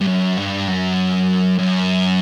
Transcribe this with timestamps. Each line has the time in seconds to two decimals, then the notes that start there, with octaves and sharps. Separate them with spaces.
0.01 G2
0.08 F#2
0.37 G2
0.68 F#2
1.58 F#2